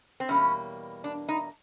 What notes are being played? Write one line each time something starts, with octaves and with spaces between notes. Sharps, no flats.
C4
E2 B2 G3 A#3 C#4
D4
D#4